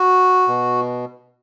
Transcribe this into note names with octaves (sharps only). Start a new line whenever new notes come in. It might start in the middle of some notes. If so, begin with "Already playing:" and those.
Already playing: F#4
B2